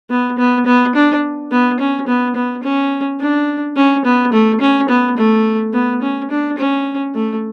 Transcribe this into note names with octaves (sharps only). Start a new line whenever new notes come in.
B3
B3
B3
D4
B3
C#4
B3
B3
C#4
D4
C#4
B3
A3
C#4
B3
A3
B3
C#4
D4
C#4
A3